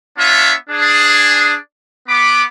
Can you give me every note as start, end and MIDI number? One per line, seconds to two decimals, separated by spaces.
0.18 0.53 59
0.18 0.53 62
0.18 0.53 65
0.18 0.53 73
0.18 0.53 76
0.18 0.53 81
0.70 1.55 62
0.70 1.55 68
2.08 2.43 59
2.08 2.43 83
2.08 2.43 86